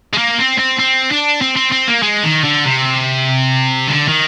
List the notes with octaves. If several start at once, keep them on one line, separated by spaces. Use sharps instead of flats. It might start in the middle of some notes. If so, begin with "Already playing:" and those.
G#3
A#3
C4
C4
C4
D4
C4
C4
C4
A#3
G#3
D#3
D3
C3
D3
D#3